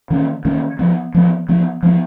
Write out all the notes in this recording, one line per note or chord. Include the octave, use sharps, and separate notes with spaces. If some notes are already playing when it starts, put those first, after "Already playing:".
D#3 A#3 C#4
D#3 A#3 C#4
F3 B3
F3 B3
F3 B3
F3 B3